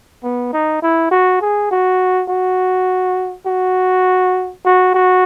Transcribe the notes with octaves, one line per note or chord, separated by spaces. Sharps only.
B3
D#4
E4
F#4
G#4
F#4
F#4
F#4
F#4
F#4